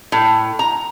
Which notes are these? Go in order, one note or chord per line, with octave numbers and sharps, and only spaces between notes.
A2
A#5